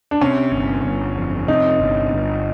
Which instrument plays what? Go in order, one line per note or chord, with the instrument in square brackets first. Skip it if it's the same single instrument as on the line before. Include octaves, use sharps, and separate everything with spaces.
[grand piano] D4
[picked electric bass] C3 [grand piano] C#4
[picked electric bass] G1
G1
F2
[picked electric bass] C3 [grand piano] D#4
[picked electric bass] G1
G1